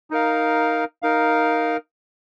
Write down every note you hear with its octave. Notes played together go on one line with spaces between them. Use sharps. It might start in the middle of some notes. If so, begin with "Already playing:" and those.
D#4 A#4 F5
D#4 A#4 F5